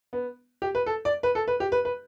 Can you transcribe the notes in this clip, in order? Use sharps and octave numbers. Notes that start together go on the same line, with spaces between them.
B3
G4
B4
A4
D5
B4
A4
B4
G4
B4
B4